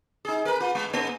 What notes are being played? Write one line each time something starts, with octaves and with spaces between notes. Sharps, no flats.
D#4 G#4
A#4 B4
F4
G#3
G#2 A#3